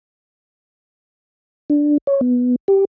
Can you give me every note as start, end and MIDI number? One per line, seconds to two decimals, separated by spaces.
1.70 1.98 62
2.07 2.21 73
2.21 2.56 59
2.68 2.85 67